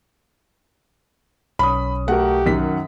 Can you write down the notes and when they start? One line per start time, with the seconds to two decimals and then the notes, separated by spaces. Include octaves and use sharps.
1.59 B1 C#4 B5 D#6
2.08 A3 F#4 G4 A#4 F#5
2.46 F#2 D#3 B6